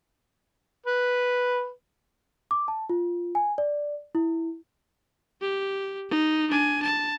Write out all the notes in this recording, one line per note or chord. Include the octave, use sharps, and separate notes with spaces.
B4
D6
A5
F4
G#5
D5
E4
G4
D#4
D4 G#5
A5